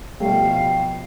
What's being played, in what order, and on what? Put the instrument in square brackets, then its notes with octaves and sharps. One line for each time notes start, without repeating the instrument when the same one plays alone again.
[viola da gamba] B2 F3 [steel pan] G3 A3 [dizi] F5 [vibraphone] G5